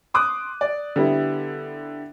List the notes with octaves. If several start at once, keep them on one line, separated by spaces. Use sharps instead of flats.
C6 D6 D#6 F#6
D5
D3 G3 B3 E4